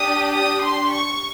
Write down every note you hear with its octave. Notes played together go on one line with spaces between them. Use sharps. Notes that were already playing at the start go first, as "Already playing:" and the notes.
Already playing: D4 G4 D#6
D#6
C6
C#6